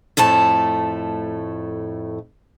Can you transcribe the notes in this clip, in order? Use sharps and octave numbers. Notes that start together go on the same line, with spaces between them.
F2 A2 A3 A5